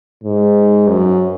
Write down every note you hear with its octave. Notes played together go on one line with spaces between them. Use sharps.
G#2
F#2